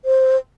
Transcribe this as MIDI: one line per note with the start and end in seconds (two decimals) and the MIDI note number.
0.05 0.37 72